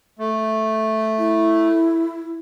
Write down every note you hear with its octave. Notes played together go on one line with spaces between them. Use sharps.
A3
E4